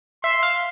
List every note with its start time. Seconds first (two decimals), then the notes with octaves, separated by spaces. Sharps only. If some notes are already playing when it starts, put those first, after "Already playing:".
0.23 E5 C6
0.43 F5